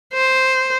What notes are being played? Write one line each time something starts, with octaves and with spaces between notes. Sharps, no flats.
C5